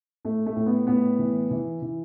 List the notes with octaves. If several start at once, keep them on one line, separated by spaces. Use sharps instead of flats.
A2 A3
A3
A2
B3
A2 B3
E3
E3
E3